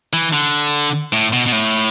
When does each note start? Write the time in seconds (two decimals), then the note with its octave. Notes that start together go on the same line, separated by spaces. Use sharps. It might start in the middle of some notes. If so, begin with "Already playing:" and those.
0.13 E3
0.33 D3
1.12 A2
1.33 B2
1.46 B2
1.52 A2